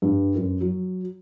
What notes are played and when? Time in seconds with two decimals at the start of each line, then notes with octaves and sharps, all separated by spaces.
0.02 G2
0.35 F#2
0.61 F#3